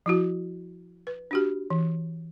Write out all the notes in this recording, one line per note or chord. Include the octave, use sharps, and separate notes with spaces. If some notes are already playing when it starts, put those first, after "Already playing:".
F3 E4 F#4
B4
D4 F#4 G4
E3